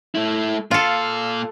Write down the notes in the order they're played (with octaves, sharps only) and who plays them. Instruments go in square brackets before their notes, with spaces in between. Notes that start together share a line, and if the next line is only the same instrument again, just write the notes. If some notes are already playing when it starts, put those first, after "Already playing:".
[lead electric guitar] A3 E4
[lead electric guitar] A#2 F5 [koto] F4 A4